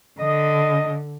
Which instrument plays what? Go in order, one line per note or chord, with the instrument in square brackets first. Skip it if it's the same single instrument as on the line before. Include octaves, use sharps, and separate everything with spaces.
[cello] D3 [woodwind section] D#5